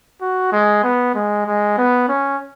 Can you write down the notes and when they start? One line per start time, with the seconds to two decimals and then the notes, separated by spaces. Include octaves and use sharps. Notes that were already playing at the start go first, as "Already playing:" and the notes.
0.21 F#4
0.52 G#3
0.83 B3
1.14 G#3
1.46 G#3
1.78 B3
2.09 C#4